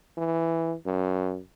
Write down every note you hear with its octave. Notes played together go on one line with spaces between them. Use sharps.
E3
F#2